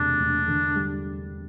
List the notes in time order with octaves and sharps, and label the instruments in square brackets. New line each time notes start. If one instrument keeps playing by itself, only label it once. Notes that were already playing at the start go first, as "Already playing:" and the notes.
Already playing: [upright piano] E1 D2 C3 [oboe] D4
[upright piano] E1
D3
G3